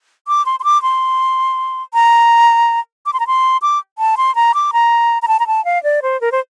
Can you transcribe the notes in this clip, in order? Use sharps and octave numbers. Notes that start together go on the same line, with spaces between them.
D6
C6
C6
D6
C6
A#5
D6
C6
A#5
C6
D6
A5
C6
A#5
D6
A#5
A#5
A5
A#5
A5
F5
D5
C5
A#4
C5